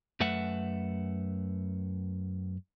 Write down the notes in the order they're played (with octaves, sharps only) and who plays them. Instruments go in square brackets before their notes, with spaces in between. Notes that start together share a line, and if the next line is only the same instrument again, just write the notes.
[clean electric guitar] F#2 A3 B4 E5 F#5